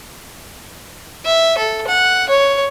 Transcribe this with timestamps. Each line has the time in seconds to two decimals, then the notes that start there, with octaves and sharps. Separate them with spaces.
1.26 E5
1.58 A4
1.87 F#5
2.29 C#5